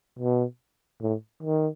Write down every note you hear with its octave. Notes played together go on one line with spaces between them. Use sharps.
B2
A2
D#3